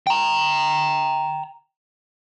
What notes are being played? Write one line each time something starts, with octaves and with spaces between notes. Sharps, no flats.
G5 A#5